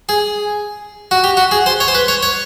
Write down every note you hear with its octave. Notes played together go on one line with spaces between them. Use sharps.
G#4
F#4
G4
F#4
G#4
C5
C#5
C5
B4
C#5
C#5